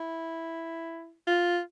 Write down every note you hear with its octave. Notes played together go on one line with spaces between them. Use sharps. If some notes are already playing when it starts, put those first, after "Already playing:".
Already playing: E4
F4